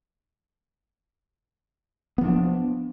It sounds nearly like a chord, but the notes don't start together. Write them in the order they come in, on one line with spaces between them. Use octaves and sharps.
B3 F3 D4